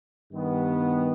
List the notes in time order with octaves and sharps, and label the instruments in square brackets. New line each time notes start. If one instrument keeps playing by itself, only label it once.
[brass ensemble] G2 D#3 B3